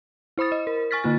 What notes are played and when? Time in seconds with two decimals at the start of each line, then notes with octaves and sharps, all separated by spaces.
0.38 E4 C5 B5 D#6 A6
0.52 D#5
0.67 A#4
0.91 G#5 C#6 F6 A6 B6
1.04 D3 A#3 F4 A6